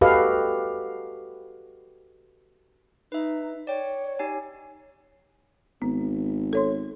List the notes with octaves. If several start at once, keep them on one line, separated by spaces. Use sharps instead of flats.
F#4 G4 A4 B4 D#5 F5
D#4 B4 E5
C#5 D5 G5
D#4 G4 G#5
G#1 B3
A4 C#5 C6